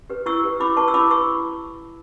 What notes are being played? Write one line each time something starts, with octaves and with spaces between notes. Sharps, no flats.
G4 B4
E4 C#6 E6
G4 B4
E4 B5 D6
B4 A5 C#6
E6
E4 B5 D6
B4 C#6 E6